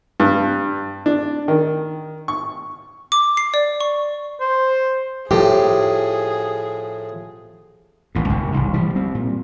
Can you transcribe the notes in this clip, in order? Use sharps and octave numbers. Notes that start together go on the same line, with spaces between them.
G2
D4
D#3
C#6
D6
C7
D5
C#6
C5
A2 F3 G4 G#4
D#1 A1 A2
F#1 C#2 G2 C#3
E1 C2 G#2
E3 F3 G3
G3 C4
A#2